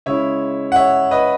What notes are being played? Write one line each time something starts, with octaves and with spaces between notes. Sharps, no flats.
C#3 G#3 C#4 E4 C#5 E5
F#5
C#5 E5
B4 D#5